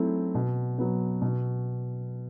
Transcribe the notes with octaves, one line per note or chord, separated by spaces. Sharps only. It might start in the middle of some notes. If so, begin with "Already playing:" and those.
Already playing: F#3 A3 C4 E4
B2
F#3 B3
B2